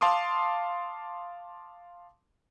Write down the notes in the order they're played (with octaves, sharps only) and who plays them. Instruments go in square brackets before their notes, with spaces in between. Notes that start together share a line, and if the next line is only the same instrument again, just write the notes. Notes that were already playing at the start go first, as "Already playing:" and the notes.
[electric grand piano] F5 A5 C6 D6 D#6